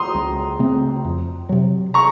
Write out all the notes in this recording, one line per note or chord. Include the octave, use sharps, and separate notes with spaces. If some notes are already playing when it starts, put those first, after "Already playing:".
Already playing: A#5 C6 D#6
C#2
C#3 A3 C4
F2
C3 F#3
A#5 C#6